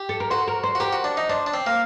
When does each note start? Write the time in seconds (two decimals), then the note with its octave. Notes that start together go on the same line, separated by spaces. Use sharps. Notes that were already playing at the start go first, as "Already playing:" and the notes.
Already playing: G4
0.09 A4
0.20 A#4
0.30 F#4 C5
0.48 A#4
0.63 C5
0.75 F#4
0.80 G4 A#4
0.93 F#4
1.04 D4
1.17 D#4
1.29 D4 C5
1.46 D4
1.54 C4
1.67 A#3